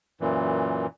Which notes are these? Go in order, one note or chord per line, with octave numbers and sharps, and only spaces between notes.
F#2 A#2 E3